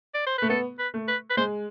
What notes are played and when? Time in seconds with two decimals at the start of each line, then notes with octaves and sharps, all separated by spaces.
0.14 D5
0.27 C5
0.38 A3 B4
0.49 B3 A4
0.79 B4
0.94 A3
1.08 B4
1.30 B4
1.37 G#3 C5